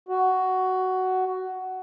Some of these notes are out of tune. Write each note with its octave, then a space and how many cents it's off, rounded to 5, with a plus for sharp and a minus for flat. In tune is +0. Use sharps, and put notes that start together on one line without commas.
F#4 +10